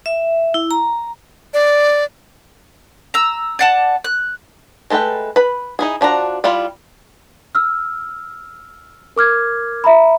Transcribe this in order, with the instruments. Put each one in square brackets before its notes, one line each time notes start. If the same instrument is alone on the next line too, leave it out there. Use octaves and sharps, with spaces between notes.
[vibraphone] E5
E4
A#5
[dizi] D5
[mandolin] A#5 E6
D5 F#5 A5
F#6
[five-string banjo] G#3 A3 A4 B4 G5
B4 B5
D#4 E4 G#4
F3 D4 F#4 A#5
G3 E4 F4 B5
[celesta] E6 F6
A#4 D6 F6 G#6
E5 A#5 B5